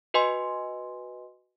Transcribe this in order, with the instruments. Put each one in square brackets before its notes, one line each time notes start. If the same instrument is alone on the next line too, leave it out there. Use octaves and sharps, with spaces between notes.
[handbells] F#4 B4 D#5 G#5 C6